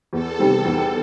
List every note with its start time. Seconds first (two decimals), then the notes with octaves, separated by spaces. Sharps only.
0.12 E2 A4
0.39 C3 D#3 G3 C4
0.65 E2